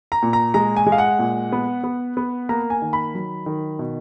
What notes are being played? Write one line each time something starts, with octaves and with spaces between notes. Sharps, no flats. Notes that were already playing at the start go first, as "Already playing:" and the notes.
A#5
A#2
A#5
G#3 A#5
G#5
G#3
F5
F#5
A#2
B3
B3
B3
A#3 A#5
G#5
D#3
B5
F#3
D#3
B2